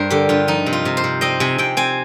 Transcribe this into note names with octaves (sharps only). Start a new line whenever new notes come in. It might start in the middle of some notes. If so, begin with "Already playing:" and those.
Already playing: G2 G3 A#4 C5
D3 G4
G2 F4
F3 D#4
C3
F4
C3
C5
C3
C4 D#5
C3 G#5
C3 G5
C4 G#5